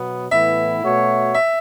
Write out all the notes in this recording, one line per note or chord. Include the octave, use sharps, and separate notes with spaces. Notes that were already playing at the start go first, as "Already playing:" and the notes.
Already playing: B2 F#3 B3
A2 E3 B3 E4 E5
B2 A3 F#4 C#5
E5